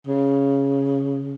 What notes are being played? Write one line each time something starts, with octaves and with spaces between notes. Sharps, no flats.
C#3